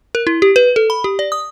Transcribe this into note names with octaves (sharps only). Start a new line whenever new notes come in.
A#4
E4
G4
B4
A4
B5
G4
D5
D#6